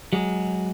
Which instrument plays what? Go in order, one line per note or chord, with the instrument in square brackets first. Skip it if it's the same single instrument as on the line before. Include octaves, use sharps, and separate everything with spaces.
[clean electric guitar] F#3 G#3